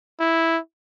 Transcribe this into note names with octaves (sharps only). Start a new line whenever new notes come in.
E4